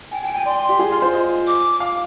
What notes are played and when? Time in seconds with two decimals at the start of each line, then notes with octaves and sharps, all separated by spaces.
0.11 G5 G#5
0.23 G5 G#5
0.34 G5 G#5
0.45 D5 C6
0.69 G4
0.79 G#4
0.91 F4
1.02 C5
1.13 D#5
1.47 D6
1.80 F5